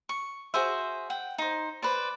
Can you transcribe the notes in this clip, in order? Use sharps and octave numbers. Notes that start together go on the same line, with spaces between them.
C#6
F#4 G#4 C5 E5
F#5 G5
D#4 C5
B4 C5 D5